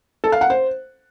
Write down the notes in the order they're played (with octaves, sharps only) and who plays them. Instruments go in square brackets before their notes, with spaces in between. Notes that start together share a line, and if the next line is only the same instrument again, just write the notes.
[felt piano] A4
F5
F#5
C5